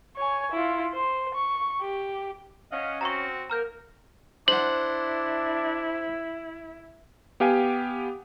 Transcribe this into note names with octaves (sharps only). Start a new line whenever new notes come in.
C#5 G#5
E4 F4
C5
C#6
G4
C#4 D#5 F5 F#5
C4 F#4 A#5 C#6
A#3 A#4 A#5 F6 G6
D4 E4 C5 F#5 F#7
B3 G4 F5 G5 G#5